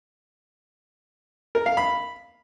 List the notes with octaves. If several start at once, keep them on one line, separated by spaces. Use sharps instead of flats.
A#4
F5
B5